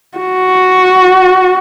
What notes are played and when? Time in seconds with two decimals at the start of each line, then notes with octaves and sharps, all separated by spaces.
0.18 F#4